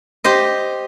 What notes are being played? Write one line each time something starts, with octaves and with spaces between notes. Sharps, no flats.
G4 C5 D#5